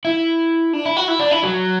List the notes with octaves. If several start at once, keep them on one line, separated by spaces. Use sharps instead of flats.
E4
D4
E4
F#4
E4
D4
E4
F#3